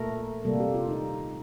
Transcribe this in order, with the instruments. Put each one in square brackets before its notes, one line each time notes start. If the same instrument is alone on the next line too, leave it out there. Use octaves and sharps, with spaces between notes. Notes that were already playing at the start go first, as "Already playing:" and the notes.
Already playing: [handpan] A#2 A3 A#4
C3 G3 A#3 A4
G4
F4
D#4